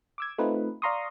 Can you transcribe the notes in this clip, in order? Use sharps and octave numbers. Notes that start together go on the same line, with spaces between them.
D6 E6 G#6
A3 C4 D#4 F4 B4
D5 F5 A#5 C6 C#6 D#6